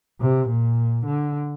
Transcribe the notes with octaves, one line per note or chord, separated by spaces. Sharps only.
C3
A#2
D3